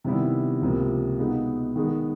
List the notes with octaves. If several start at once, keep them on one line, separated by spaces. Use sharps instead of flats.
C3 D#3 G3 B3 E4
C#2 C3 F3 A#3
B2 G#3 B3 D#4
D#3 G#3 B3